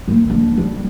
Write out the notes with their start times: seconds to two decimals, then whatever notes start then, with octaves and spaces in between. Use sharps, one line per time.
0.08 D#3 A#3
0.30 F3 D4
0.57 G3 D4